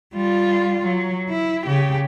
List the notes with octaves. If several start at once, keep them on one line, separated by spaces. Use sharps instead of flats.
G3 F4
F#3
E4
C#3 G4